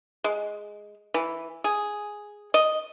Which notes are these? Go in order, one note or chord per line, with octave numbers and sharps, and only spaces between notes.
G#3
E3
G#4
D#5